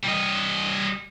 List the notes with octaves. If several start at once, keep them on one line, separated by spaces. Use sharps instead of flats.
G3 D#5